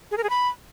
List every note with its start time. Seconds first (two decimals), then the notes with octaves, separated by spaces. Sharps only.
0.11 G#4
0.17 A#4
0.24 G#4
0.30 B5